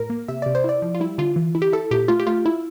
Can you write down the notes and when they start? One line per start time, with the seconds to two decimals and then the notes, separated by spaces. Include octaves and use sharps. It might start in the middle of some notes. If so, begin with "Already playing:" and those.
Already playing: A2 A#4
0.10 A#3
0.28 C3 E5
0.42 C3 D5
0.55 C5
0.64 E4 D5
0.82 F3
0.94 F4
1.00 G3 E4
1.18 D3 F4
1.36 E3
1.55 E4
1.62 G4
1.72 E4 A4
1.91 A#2 G4
2.08 A3 F4
2.20 G4
2.27 A3 F4
2.46 E4